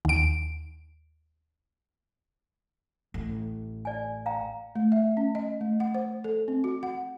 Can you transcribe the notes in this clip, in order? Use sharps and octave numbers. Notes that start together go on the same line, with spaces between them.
D#2 D7
A1
D5 G#5
F5 G5 A#5
A3
E5
C#4
D#5
A3
F#5
C5
A4
C4
F#4
F#5